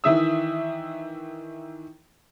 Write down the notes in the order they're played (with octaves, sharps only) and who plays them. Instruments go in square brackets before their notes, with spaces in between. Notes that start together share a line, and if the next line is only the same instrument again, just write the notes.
[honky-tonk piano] D#3 E3 E5 D#6 E6